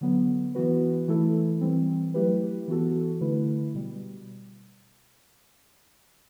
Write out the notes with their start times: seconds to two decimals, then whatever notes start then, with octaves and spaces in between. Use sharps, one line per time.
0.01 D3 F#3 B3
0.55 E3 B3 F#4 B4
1.08 E3 A3 E4 A4
1.61 E3 G3 C4
2.14 F#3 A3 E4 G4 B4
2.68 E3 B3 F#4 A4
3.21 D3 A3 E4 B4
3.74 B2 G3